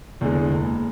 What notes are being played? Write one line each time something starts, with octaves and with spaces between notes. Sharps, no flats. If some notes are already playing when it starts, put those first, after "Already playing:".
E2 D3 G#3
F#1